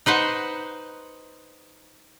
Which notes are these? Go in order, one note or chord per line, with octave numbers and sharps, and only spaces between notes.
D#4 B4 C5 F#5